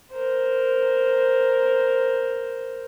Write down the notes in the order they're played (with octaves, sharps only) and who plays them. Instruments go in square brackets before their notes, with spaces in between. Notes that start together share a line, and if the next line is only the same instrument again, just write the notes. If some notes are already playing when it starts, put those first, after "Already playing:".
[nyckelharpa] A#4 C5